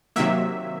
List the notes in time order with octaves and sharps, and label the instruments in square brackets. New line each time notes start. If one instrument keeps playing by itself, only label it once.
[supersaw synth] C3 D#3 F#3 A#3 E5